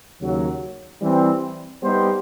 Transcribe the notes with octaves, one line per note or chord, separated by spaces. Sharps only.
D#2 C#3 F#3
E3 G3 C4
G3 B3 D#4 G4 C5